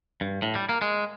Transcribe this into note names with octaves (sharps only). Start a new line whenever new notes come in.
G2
A2
G3
A#3
G#3